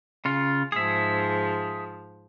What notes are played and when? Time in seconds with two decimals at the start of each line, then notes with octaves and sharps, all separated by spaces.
0.25 C#3 F4
0.72 G#2 F3 G#4 E5